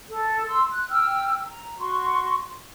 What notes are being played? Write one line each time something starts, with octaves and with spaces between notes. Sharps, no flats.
A4
C6 E6
F#6
G5 E6 F6
A#5
F#4 C6 C#6